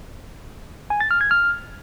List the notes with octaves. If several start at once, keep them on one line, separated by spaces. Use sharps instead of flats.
G#5
A6
F6
G#6
F6